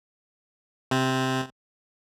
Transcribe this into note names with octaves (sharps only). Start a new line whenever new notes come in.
C3 C4